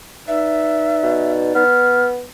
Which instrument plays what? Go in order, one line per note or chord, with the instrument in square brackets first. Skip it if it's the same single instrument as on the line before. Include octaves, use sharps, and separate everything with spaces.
[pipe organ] D#4 B4 D5 [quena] E5
[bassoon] B2
[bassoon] B3 [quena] F6